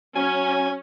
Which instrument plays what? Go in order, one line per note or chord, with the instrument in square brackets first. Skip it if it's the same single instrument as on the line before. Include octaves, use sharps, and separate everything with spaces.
[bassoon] F#3 [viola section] C#4 [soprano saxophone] G#5